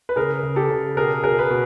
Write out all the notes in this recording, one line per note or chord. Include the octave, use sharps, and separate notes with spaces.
B4
C#3 G#4 A#4
C#3
G4 A4
C#3
B2 G#4 A#4
B2 G#4 A#4
B4
B2